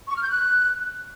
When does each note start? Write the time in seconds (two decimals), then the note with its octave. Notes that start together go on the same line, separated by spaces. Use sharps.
0.08 C#6
0.16 F6
0.23 G6
0.30 F#6